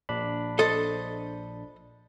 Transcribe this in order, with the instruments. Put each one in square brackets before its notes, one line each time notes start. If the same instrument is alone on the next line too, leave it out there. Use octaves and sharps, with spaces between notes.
[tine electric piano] A#1 D4 B5
[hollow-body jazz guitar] A4 C5 D#5